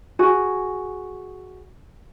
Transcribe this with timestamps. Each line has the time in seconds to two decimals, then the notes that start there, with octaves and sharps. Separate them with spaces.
0.19 F#4 G#4